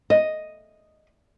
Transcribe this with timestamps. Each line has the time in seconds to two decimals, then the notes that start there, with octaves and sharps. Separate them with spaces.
0.10 D#5